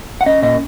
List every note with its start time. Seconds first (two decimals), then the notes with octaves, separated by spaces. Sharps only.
0.21 F#5
0.26 C#4 D#5
0.43 A#2 D#5